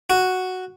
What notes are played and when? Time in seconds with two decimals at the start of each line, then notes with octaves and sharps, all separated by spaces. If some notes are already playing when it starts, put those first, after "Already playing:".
0.10 F#4